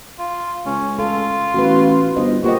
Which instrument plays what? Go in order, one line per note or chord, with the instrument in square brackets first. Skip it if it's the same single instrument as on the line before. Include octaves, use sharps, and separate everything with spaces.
[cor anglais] F4
[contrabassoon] C#2 [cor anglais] C#4
[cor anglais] F4 [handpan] A4
[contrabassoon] A1 [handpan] F#4 B4
[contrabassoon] G1 [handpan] C5 D#5
[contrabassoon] A#2 [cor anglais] F#4 [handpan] G4 C5 D#5